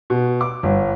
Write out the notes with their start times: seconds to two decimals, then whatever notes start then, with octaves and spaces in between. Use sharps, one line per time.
0.10 B2
0.41 D6
0.63 G1